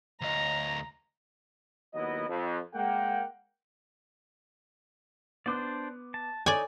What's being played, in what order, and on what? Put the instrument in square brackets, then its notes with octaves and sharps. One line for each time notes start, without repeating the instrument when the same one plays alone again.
[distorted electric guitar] D2 D#5 [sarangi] A#5
[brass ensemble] D#2 F#3 B3 E4 D#5
F2
G#3 A#3 F#5 G5
[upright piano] B3 D6 F#6 [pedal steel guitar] D4 C5 D5
[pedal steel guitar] A5
[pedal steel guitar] D#4 [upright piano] A4 C#5 [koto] D5 G#5